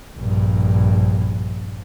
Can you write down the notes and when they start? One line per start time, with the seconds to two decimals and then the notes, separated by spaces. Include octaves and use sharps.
0.18 A#1 G2